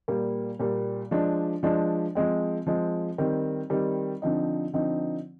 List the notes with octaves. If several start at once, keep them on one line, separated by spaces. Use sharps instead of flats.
A#2 G3 A#3
A#2 G3 A#3
F3 G#3 D4
F3 G#3 D4
F3 G#3 C4
F3 G#3 C4
D#3 G3 C4
D#3 G3 C4
D3 F3 C4 D#4
D3 F3 C4 D#4